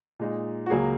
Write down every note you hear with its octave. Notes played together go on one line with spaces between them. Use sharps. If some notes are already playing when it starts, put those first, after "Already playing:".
A#2 G#3 D#4
F#4
C#2 C#3 F#3 A#3 G#4